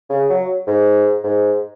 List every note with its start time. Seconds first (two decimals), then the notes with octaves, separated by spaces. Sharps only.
0.10 C#3
0.29 F#3
0.67 G#2
1.24 G#2